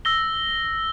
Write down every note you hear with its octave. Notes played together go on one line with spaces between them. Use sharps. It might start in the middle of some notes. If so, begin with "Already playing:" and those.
E6 A#6 G7